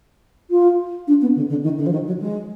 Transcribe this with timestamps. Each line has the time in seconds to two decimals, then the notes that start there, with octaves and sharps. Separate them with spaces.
0.50 F4
1.07 D4
1.21 B3
1.35 D3
1.49 D3
1.63 D#3
1.78 D3
1.86 F3
1.92 D#3
2.06 F#3
2.20 G#3